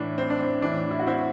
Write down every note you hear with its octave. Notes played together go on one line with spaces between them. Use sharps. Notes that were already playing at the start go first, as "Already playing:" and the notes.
Already playing: A2 E3 D4
C4
D4
C4
A2 E3 D4
E4
F#4
C4 E4